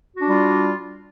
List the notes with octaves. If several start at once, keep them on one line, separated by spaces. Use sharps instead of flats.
G3 D4 F4 F#4